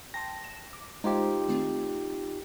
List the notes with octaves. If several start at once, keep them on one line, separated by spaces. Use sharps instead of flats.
G5 A5 C6 A#6
E7
D6
G#3 D#4 F4 G4 C5
D#3 A3 C4